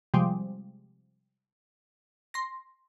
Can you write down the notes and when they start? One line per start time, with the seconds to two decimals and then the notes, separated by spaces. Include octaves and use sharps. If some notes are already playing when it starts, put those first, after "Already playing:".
0.14 C3 F3 G3 G#3
2.34 C6 A#6